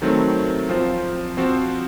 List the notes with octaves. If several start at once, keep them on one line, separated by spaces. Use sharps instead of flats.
D#3 F#3 A3 C4
F3 C4 F4 C5
F3 C4 F#4 C5